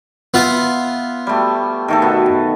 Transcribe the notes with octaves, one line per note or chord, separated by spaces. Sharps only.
B3 F4 E5
G3 A3
D#3 A3 A4
B2